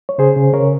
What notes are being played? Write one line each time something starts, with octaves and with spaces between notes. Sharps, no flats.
C#5
C#3 G#4 C5
C#3
C#3 A#4 C#5